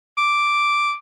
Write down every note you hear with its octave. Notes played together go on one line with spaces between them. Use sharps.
D6